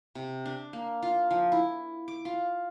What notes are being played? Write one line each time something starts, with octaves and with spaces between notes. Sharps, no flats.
C3
D4
A#3
F4
F3
E4
D6
F4